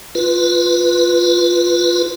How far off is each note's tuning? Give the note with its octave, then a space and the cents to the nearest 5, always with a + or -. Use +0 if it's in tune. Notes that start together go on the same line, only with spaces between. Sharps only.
F4 +0 B4 -5